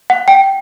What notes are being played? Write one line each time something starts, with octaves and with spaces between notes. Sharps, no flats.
F#5
G5